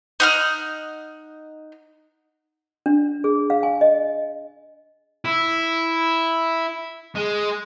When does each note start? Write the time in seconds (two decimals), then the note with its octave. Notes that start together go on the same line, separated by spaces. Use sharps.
0.20 D#4 F#5 F6
2.86 D4
3.24 G#4
3.50 F5
3.63 G#5
3.81 D#5
5.25 E4
7.16 G#3